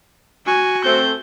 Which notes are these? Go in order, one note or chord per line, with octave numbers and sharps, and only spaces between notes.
F#4 G#5
A3 C4 G6